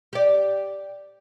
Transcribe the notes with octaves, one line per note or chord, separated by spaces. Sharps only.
G4 D5